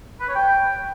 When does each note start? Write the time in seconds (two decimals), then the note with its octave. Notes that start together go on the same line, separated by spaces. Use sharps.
0.20 B4
0.27 C#5
0.35 G5